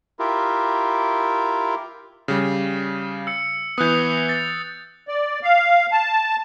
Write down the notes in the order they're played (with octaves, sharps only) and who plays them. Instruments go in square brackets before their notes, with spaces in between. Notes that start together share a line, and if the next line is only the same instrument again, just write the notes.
[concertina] E4 F4 G4 A#4
[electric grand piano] C#3 G3
[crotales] E6 C#7
[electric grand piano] E3 B3 [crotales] D#6 F#6 G6
[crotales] A6
[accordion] D5
F5
A5